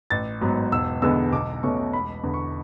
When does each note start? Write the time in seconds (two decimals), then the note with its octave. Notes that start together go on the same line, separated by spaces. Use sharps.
0.10 A1 A6
0.41 G#2 F#3 B3
0.72 E1 E6
1.02 E2 D3 G#3 B3 E6
1.32 B1 D6
1.63 B2 A3 C#4 C#6
1.93 E1 B5
2.23 E2 D3
2.34 C#6